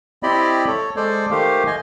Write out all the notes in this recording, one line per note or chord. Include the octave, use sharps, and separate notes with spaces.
C4 E4 G4 D5 D#5 B5
A4 C#5
G#3 A4 C5 D5
D#3 A3 G4 C5 F5
D#5 G#5